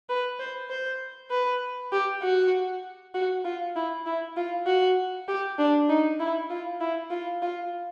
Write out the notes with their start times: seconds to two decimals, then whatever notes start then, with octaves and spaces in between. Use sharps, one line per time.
0.09 B4
0.40 C5
0.70 C5
1.31 B4
1.92 G4
2.23 F#4
3.14 F#4
3.45 F4
3.76 E4
4.06 E4
4.37 F4
4.67 F#4
5.28 G4
5.59 D4
5.89 D#4
6.20 E4
6.50 F4
6.80 E4
7.11 F4
7.42 F4